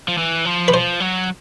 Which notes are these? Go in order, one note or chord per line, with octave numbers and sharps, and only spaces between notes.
F3
E3
F3
B4
F3 C5
F#3